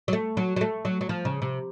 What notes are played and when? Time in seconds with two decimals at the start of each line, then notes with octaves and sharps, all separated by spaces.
0.08 F#3
0.13 A3
0.37 F#3
0.56 F#3
0.61 A3
0.85 F#3
1.01 F#3
1.09 F3
1.25 C#3
1.42 C3